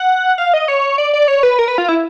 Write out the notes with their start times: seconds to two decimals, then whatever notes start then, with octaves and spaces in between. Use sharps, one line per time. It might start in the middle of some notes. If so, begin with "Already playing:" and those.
Already playing: F#5
0.38 F5
0.54 D#5
0.68 C#5
0.98 D5
1.13 D5
1.28 C#5
1.43 B4
1.59 A#4
1.68 B4
1.78 F4
1.88 E4